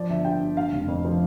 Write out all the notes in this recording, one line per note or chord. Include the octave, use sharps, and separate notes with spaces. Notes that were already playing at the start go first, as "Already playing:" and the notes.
Already playing: F3 D5
G1 E5
G2 G5
G2
D3 F5
F1
F2
F3